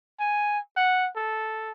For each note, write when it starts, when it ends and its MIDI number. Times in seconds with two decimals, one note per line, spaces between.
0.20 0.59 80
0.77 1.07 78
1.16 1.72 69